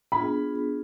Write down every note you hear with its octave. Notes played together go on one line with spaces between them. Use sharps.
B3 D4 F4 G#4 B5